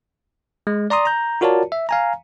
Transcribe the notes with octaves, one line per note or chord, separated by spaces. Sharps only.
G#3
D5 A#5 C6 D#6
A#5 G6
F4 F#4 A#4 C#5 D5 A5
E5
F5 G#5 A#5